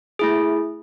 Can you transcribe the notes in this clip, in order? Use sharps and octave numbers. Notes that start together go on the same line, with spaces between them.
A3 E4 G#4